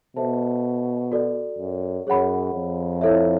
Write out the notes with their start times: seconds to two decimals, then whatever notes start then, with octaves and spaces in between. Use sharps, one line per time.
0.16 B2 A4 C5 E5 A5
1.12 F#4 A4 D5
1.58 F#2
2.07 F#2 G#4 C#5 F#5 B5
2.54 F2
3.01 E4 A4 C#5 E5